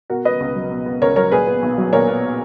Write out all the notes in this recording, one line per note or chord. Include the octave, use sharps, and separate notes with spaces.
B2 F#4 A#4
B3 B4 D#5
C#2
F#3
B2
B3
C#2 A#4 C#5
F#3 A#4 C#5
A#2 G#4 B4
B3
B1
F#3
A#2 A#4 C#5
B3